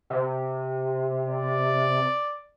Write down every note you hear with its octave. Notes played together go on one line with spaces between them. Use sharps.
C3
D5